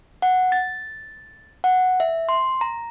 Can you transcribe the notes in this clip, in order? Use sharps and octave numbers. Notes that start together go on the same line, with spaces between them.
F#5
A6
F#5
E5
C6
A#5